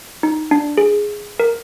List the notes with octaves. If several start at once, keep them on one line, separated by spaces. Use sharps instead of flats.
D#4
D4
G#4
A#4